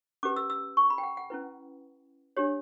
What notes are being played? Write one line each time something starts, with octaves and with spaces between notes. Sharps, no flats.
C#4 G4 B4 D6
E6
E6
C#6
B5
G5
F#5
F#5
C#4 E4 B4
D4 G4 C#5